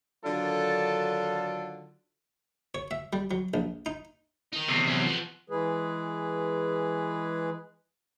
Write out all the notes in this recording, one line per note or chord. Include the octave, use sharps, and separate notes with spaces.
D3 D#3 F#3 D4 F4 A4
C#5
E5
G3
F#3
A#1
D#4
D#3 D#4
E2 C3
F#2 C#4
F3 B3
E3 G#3 G#4 B4